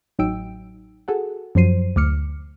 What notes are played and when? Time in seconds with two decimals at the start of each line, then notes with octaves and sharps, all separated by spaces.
0.19 A1 F#3 D#4 G5 E6 D7
1.08 F#4 G#4 A4 F#5
1.55 F#2 F3 F#3 C5 C7 D#7
1.96 D2 D6 F6 C#7